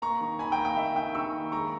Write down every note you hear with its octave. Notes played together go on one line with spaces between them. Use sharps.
A#3 A#5 C#6
D#3
D#3 G#5 B5
G5 A#5
A#3
G5
A#3 E5
D#3 G5
D#3 C#6 E6
A#3
G#3 A#5 C#6